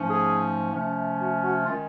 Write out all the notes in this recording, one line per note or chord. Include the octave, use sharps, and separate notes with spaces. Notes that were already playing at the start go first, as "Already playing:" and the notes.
Already playing: G#2 F3 A3 C#4
G#4
C3 F3 A3 C#4
F#4
F#4
D#3 G#3 C#4 F4